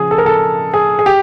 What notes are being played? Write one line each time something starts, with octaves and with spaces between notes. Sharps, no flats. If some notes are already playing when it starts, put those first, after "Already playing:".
Already playing: C#3 F3 G#4
A4
A#4
A4
G#4
G#4
G4